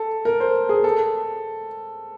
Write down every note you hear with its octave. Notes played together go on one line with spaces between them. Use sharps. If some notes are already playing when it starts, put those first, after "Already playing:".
Already playing: A4
A#4
C5
G#4
A4